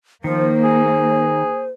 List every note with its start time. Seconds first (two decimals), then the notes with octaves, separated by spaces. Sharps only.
0.24 D#3 F3 A#3 C5
0.63 G#4